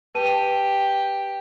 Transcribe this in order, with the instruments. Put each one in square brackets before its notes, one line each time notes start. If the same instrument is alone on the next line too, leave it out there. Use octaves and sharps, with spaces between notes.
[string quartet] G4 [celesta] B4 A5 D#7